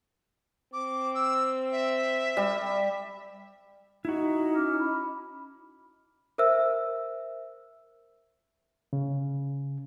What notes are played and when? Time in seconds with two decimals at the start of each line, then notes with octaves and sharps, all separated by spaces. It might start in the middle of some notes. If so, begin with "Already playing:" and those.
0.73 C4 D6
1.15 E6
1.72 E5
2.37 G3
4.05 D#4 E4 F#4
4.55 C#4 D6 F6
4.80 B5
6.38 A#4 C5 E5 E6
8.93 C#3